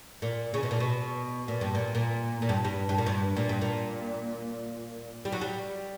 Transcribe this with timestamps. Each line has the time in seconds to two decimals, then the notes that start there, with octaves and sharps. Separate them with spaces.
0.22 A#2
0.54 C#3
0.63 B2
0.71 A#2
0.80 B2
1.48 A#2
1.61 G2
1.75 A#2
1.95 A#2
2.42 A#2
2.49 G2
2.65 G2
2.89 G2
2.98 A#2
3.06 G2
3.37 A#2
3.49 G2
3.62 A#2
5.25 G3
5.32 F#3
5.41 G3